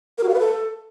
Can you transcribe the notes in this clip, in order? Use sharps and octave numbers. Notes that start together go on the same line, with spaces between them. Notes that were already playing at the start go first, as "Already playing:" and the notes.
A#4
F#4
F5
B4
A4